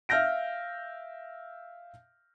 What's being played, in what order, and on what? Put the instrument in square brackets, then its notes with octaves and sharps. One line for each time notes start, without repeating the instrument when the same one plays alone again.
[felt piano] E5 F5 F6 G6 A#6 D7